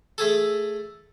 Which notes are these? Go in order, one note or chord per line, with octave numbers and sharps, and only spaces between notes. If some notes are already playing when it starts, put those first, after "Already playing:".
A3 G#4 A4